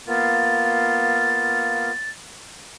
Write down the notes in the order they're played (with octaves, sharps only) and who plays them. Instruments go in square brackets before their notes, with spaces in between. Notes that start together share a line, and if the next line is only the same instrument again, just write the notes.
[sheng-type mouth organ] A#3 B3 F4 [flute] A6